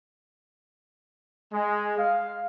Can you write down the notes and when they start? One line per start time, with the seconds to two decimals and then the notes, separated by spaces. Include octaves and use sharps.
1.53 G#3
1.99 F5